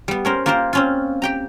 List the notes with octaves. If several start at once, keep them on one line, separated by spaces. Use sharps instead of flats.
G3 B3
C#4 A#4 C5
A#3 F4 G4 A#4 C5
C4 C#4 F4
G4 G5 A#5